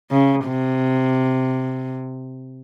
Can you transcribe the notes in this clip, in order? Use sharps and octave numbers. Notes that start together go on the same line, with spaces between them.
C#3
C3